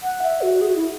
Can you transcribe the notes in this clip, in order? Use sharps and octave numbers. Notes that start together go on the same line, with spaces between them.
F#5
E5
F#4
G#4
F#4
E4